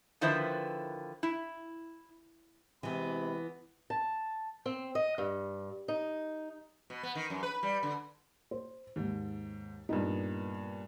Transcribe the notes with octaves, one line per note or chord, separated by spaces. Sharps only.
D3 D#3 F3 E4 B4 C5
E4
C3 E3 G#3 B3 B5
A5
C4
D#5
G2
D#4
B2
B3
D#3
F#2
B4
G3
D3
C5
D#2 G#2
G2 A#2 B3 D#4